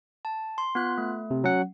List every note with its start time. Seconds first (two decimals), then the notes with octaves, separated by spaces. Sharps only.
0.25 A5
0.58 C6
0.75 B3 F4 F#6
0.98 A3
1.31 C3
1.44 F#3 C#4 F#5